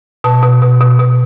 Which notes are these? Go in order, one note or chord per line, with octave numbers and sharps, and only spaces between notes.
B2 A5
B2
B2
B2
B2